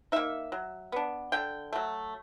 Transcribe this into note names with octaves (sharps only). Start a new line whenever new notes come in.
A#3 D#4 E5
F#3
B3 D4
D3 G5
F#3 A3